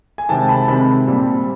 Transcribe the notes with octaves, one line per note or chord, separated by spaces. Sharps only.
G#5
C3 D#3 G#3 C4 G5 A5
A5 B5
C3 D#3 G#3 C4 A5 B5
A#2 G3 C4